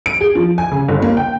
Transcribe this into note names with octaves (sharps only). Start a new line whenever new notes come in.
D7
G#4
F3
G#5
C#3
G1
A#3
G5